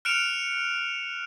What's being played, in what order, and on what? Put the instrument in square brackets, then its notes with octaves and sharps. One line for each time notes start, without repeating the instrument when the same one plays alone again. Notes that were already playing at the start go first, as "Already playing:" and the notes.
[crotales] F6 F#6 C#7 D7 E7 F7